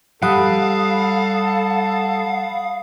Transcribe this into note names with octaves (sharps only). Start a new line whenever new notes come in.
G3 A4 F5 F#5 B5 D#6